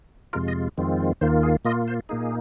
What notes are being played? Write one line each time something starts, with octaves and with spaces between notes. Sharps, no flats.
F2 C3 G#3 F4 A#4
D#5
F2 D#3 G#3 C4 F4
D#2 D#3 A#3 F4 C5
G#4
A#2 A#3 F4 D#5
C5
A#2 A#3 D#4 G#4